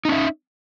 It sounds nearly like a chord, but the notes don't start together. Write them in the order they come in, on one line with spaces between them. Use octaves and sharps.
D#4 C#4 E5